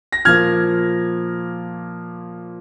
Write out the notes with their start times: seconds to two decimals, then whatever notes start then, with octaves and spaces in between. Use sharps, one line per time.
0.13 A#6
0.25 A#2 F3 A#3 F6 G#6